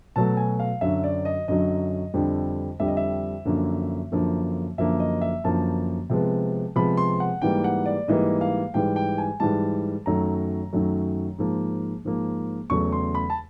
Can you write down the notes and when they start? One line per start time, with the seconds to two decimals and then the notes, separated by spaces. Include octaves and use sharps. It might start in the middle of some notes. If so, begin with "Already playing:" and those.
0.16 B2 F#3 A3 A5
0.37 G#5
0.60 F5
0.81 F#2 D3 F#3 E5
1.04 D5
1.25 D#5
1.48 F#2 D3 F#3 D#5
2.14 F2 D3 G3
2.80 F2 D3 G3 E5
2.88 D#5
2.97 E5
3.45 F#2 D3 F3 A#3
4.12 F#2 D3 F3 A#3
4.78 F#2 D3 F3 A#3 E5
5.00 D#5
5.21 E5
5.44 F#2 D3 F3 A#3 A5
6.10 C3 F3 G#3 B3
6.76 C3 F3 G#3 B3 B5
6.97 C6
7.20 F#5
7.42 G#2 E3 G3 A#3 G5
7.64 F#5
7.86 D5
8.08 G#2 E3 G3 A#3 D#5
8.41 F5
8.74 G#2 E3 G3 G5
8.96 G5
9.18 G#5
9.40 G#2 E3 G3 A5
10.06 F#2 D#3 F#3 A3 A#5
10.73 F#2 D#3 F#3 A3
11.39 G#2 F3 A#3
12.05 G#2 F3 A#3
12.70 E2 C#3 F#3 A3 C#6
12.92 C6
13.15 B5
13.30 A5